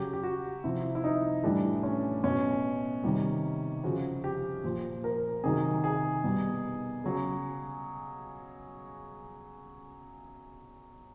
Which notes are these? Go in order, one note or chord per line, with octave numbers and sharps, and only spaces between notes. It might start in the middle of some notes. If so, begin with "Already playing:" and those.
Already playing: C#3 F#3 G4
G4
F#4
C3 F3 E4
E4
D#4
A2 E3 G3 D4
C#4
B2 F#3 C#4
C3 D#3 G3
C#3 F3 F#4
G4
A#2 F3
A#4
C3 D#3 F#3 G#4
G#4
B2 G3
C#3 F#3